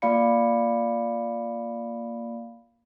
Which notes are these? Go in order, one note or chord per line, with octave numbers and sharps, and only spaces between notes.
A#3 F4 D5 F5 B5 C#7